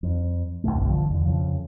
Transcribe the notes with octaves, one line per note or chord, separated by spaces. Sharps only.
F2
D#2 G#2 B2 A3
G1 C2
D3 F3
E2 D3
F2 C#3 F3